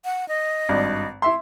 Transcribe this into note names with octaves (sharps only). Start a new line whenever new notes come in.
F#5
D#5
G#1 G2 D5
E4 E5 C6